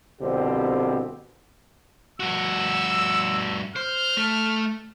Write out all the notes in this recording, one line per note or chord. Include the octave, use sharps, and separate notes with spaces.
C2 B2 D3 F3 C4 G4
G2 F#4 E6
C5 F6
A3